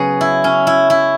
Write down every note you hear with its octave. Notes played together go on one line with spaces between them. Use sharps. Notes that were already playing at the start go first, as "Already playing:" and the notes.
Already playing: C#3 F#3 B3 G#4 B4 C#5
E4
C#4
E4
E4